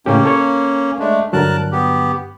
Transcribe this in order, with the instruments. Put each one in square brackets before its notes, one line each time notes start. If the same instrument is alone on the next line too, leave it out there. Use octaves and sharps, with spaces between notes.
[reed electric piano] A2 C#3 G4 [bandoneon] A#3 C#4
[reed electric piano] A4 C#5
[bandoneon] G#3 A3 D4
[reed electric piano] G2 D3 F#3 [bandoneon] A#4 A5 F#6
[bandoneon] B3 G4